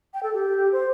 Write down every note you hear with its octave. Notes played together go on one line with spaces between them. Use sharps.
G5
A4
G4
C5